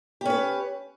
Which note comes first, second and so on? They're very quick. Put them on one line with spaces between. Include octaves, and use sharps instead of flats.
G4 C#4 B4